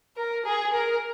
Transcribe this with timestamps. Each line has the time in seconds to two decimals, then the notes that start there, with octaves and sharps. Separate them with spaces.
0.17 A#4
0.45 G#4
0.73 A#4